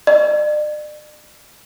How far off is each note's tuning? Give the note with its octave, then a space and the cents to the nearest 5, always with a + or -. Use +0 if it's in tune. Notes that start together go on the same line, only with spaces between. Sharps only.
D5 +40